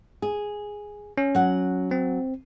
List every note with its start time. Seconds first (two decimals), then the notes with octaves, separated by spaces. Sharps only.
0.22 G#4
1.18 C#4
1.35 F#3 F#5
1.91 C4